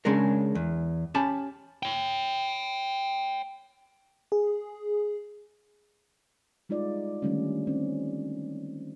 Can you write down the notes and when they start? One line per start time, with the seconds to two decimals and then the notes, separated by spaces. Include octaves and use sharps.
0.05 C#3 G#3 C#4 D4 A#4
0.55 E2
1.15 C#4 G4 A5 B5
1.83 C#5 G5
4.32 G#4
6.69 G3 G#3 D#4 F4 D5
7.22 D3 D#3 G3 A3 C#4
7.67 C4 C#4 D#4